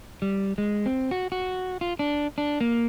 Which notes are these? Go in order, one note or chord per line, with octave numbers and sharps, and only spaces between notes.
G3
G#3
C4
F#4
F#4
F4
D4
D4
A#3